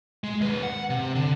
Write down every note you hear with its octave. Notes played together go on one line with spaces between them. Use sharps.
G#3
D#2 B4
F#5
C3
D3